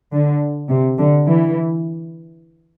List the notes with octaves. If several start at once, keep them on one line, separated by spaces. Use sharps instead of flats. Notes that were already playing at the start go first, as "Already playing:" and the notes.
D3
C3
D3
E3